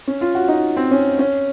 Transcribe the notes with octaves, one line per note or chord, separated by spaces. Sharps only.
C#4
F4
F#4
D#4
C4
C#4
C#4